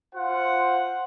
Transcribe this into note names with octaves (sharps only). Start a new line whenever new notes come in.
F4 C5 F#5